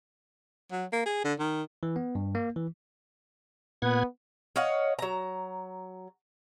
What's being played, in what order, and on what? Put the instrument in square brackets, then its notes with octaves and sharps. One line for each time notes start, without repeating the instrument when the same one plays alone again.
[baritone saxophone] F#3
A#3
G#4
D3
D#3
[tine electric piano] E3
B3
G2
A#3
E3
[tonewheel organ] A#2 F#5 G#6 [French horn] B3
[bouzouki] C#5 D#5 F5 F#5
F#3 A#5